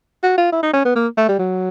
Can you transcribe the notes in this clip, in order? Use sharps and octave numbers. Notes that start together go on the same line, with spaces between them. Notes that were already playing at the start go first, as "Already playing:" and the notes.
F#4
F4
E4
D#4
C#4
B3
A#3
A3
G3
F#3